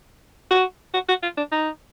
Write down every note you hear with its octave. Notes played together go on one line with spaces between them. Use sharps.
F#4
F#4
F#4
F4
D4
D#4